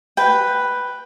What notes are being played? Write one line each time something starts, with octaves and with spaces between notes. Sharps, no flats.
B4 G5